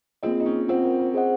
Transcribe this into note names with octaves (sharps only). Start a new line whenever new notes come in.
A#3 C4 F4 G#4 D#5
D#4
C#4
C4 F4 C5 F#5
A#3
A#3
G#4 C5 D#5 F#5